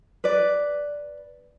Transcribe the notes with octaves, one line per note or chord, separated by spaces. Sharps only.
B4 D5